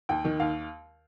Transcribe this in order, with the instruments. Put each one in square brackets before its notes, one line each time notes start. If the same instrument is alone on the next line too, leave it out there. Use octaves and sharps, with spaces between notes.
[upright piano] D#2 G5
D#3
D#2 F5